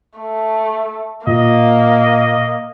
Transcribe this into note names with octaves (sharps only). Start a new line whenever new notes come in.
A3
A#2 A#3 D#5